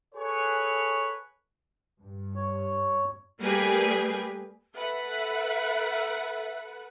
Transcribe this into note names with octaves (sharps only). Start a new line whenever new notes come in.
G#4 A4 B4 C#5
G2
C#5
G3 A3 A#3 G4 G#4 B4
A4 B4 E5 F#5